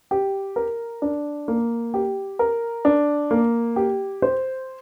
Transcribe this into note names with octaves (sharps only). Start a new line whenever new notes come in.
G4
A#4
D4
A#3
G4
A#4
D4
A#3
G4
C5